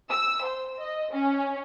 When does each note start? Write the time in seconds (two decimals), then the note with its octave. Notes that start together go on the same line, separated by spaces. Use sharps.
0.11 E6
0.44 C5
0.79 D#5
1.12 C#4